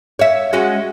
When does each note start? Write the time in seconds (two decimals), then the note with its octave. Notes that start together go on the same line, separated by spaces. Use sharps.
0.19 C#5 E5
0.53 G#3 C#4 F#4